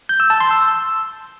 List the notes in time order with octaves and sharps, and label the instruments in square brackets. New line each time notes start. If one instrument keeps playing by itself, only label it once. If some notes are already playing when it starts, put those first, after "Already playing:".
[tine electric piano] G6
E6
A5
C6
E6